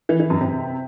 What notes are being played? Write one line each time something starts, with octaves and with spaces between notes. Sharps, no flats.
E3
E3
F#2
C3